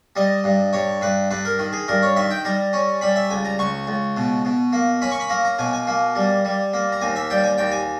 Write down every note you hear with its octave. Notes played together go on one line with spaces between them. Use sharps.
G3 D#5
G2
G2 C#5
G2 B4
G2 B4
A#4
D#3
G#4
G2 A#4
C#5
D#3 E5
G5
G3 A#5
C#4
G3 B5
E5
C#2 G#5
A#5
C#2 C#6
C#2
B2
B2
A#3
C#4 B5
C#6
B5
A#3 A#5
A#5
B2 G#5
G#5
A#3
G3
G3
A#3
A#5
D#2 G#5
E5
G3 G5
G#5
D#2 G5
G#5